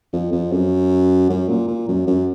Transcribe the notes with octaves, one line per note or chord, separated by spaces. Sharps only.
F2
F2
F#2
F#2
A#2
A#2
F#2
F#2